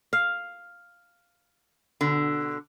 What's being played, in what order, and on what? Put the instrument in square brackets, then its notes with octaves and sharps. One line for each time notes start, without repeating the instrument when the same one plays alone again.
[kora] F5
[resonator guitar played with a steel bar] B2 D3